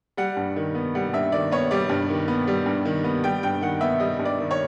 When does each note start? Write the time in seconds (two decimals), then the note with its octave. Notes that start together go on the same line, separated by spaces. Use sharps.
0.17 G3 F#5
0.37 G2
0.56 D#3
0.75 B3
0.95 G3 F#5
1.13 G2 E5
1.32 D#3 D5
1.51 B3 C#5
1.71 G3 D5
1.89 G2
2.10 D#3
2.28 B3
2.47 G3
2.66 G2
2.85 D#3
3.04 B3
3.24 G3 G5
3.43 G2 G5
3.61 D#3 F#5
3.81 B3 E5
4.00 G3 D#5
4.19 G2
4.25 D5
4.39 D#3
4.51 C#5